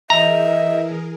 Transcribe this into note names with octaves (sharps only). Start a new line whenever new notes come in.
E3 G#4 A#4 D#5 E5 A#5